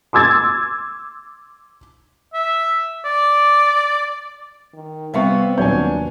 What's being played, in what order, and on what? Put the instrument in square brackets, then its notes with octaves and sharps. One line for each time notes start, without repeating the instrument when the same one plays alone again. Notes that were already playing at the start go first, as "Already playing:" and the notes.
[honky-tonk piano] C6 D6 E6 G#6 A6
[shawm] E5
D5
[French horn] D#3
[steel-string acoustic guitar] C3 G3 B3 [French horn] C4 [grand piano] E5 F5 C#6
[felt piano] D#1 F#3 G6 [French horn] D4 [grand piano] C#5 G#5